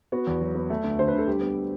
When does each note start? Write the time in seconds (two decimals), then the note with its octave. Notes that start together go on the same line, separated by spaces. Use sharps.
0.12 B3 F#4
0.27 E2
0.41 F#3
0.55 B3
0.70 A3
0.84 D2
0.98 D3 C5
1.08 B4
1.13 D3
1.18 A4
1.27 G3 G4
1.41 B3